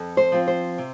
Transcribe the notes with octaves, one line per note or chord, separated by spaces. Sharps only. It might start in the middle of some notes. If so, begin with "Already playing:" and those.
Already playing: F2
C5
F3 C4
C5
C3